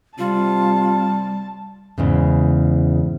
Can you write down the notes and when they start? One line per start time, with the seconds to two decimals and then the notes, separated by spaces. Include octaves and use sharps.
0.19 C3 G3 F4 A5
1.98 E2 G#2 C#3